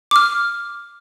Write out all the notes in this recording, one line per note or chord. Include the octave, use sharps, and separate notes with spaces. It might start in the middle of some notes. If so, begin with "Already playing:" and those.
D6 F6